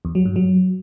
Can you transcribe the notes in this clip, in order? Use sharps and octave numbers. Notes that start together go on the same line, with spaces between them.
E2
F#3
G2
F#3